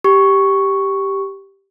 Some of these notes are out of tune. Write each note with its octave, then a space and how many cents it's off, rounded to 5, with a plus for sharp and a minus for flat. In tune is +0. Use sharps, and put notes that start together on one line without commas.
G4 +0 C#6 +0